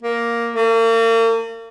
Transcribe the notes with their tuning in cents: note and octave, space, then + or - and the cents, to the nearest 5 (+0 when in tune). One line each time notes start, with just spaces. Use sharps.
A#3 +5
A#3 -40